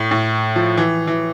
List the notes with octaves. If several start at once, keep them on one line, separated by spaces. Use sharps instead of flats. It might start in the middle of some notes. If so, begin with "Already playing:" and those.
Already playing: A2
A2
F3
E3
E3